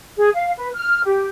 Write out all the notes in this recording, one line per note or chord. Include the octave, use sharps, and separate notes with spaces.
G#4
F5
B4
F6
G4